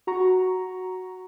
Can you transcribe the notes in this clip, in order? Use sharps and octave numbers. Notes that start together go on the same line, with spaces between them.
F#4 A#5 C#6